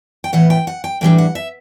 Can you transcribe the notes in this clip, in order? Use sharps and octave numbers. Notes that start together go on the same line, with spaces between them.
G5
A2 E3 B3 F#5
G5
F#5
G5
A2 E3 G3 D4 G5
F#5
E5